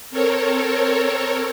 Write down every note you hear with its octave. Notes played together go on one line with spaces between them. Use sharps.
C4 A4 A#4 C#5